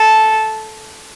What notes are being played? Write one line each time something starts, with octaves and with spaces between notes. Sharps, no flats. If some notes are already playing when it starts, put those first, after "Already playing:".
Already playing: A4 A5